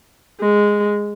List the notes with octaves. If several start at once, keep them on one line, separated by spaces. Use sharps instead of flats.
G#3